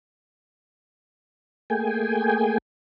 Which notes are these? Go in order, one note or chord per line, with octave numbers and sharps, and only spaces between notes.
A3 A#3 G#4 G5 G#5